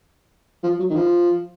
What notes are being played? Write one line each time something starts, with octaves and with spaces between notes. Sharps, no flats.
F3
F#3
D#3
F3